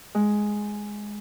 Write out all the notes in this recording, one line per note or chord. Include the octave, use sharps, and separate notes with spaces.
G#3